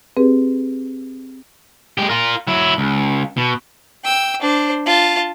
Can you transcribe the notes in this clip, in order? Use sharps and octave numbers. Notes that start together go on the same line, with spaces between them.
C4 G4 G#4 B4
G#3 G4
F4 A#4
F#3 E4
C#2
B2
G5 E6
D4 C5
F4 A5